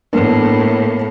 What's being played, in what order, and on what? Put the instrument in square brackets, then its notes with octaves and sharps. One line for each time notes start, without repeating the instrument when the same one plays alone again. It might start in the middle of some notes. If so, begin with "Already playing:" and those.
[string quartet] A2 [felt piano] A#3 B3 D4